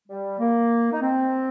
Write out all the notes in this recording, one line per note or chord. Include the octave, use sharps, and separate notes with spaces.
G3
A#3
D#4
C4